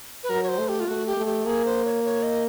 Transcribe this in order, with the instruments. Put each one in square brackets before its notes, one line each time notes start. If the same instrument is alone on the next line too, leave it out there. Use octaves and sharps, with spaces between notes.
[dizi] B4
[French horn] F#3 [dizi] A#4
[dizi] C#5
C5
[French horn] A3
[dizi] G4
F4
[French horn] A3 [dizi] F#4
[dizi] G4
[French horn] A3
[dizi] G4
[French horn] A#3 [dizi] G#4
[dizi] C5
C#5
C#5
D#5